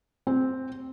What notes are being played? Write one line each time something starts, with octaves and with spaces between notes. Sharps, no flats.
C4